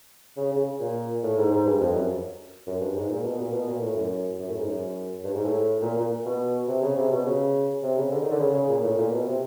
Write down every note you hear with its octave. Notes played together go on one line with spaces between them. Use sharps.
C#3
C#3
A#2
A2
G#2
G#2
G2
F2
F#2
F#2
G2
G#2
A#2
B2
A#2
B2
A#2
A2
F#2
F#2
A2
G#2
F#2
G2
G#2
A2
A#2
A#2
B2
C3
C#3
C3
B2
C#3
C3
C#3
D3
D#3
D3
C#3
C#3
A#2
A2
A#2
B2
C3